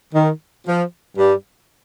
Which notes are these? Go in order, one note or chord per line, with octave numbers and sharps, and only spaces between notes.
D#3
F3
G2 G3